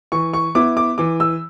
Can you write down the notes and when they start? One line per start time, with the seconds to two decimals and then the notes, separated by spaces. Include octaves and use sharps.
0.12 E3 C#6
0.33 C#6
0.55 B3 E4 D6
0.77 D6
0.98 E3 D6
1.20 E6